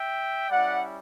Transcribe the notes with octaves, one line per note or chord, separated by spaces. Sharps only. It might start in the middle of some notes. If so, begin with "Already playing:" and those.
Already playing: E5 G5
G3 C#4 E4 D5 F#5